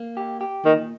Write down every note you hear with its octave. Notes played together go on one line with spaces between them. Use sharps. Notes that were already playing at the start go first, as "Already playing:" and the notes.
Already playing: A#3
G4
G4
A#2 D#3